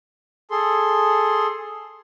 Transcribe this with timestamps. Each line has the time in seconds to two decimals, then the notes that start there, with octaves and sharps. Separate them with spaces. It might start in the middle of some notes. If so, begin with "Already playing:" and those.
0.51 G#4 A4 C6